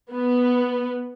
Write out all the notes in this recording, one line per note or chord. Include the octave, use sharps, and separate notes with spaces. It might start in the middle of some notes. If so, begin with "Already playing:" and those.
B3